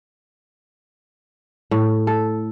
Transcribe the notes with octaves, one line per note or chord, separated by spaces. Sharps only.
A2
A4